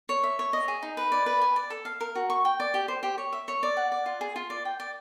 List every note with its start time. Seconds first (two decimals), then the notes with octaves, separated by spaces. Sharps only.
0.09 C#5
0.23 E5
0.39 C#5
0.53 D#5
0.68 G#4
0.83 D#4
0.97 B4
1.12 D5
1.26 B4
1.41 G#5
1.56 D5
1.70 A4
1.85 F5
2.01 A#4
2.15 F#4
2.30 C#6
2.45 G5
2.60 D5
2.74 G4
2.88 C5
3.03 G4
3.18 C#5
3.33 E5
3.48 C#5
3.63 D5
3.77 F#5
3.92 D5
4.06 F4
4.21 G#4
4.36 F4
4.50 D5
4.65 G5
4.80 D5